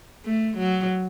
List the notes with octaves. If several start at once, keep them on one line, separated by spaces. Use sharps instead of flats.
A3
F#3